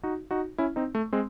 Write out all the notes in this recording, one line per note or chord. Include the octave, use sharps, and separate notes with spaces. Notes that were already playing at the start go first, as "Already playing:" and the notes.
D#4 F#4
D#4 F#4
C#4 E4
C4 D#4
A3
G#3 C4